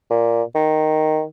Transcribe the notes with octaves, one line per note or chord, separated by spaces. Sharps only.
A#2
D#3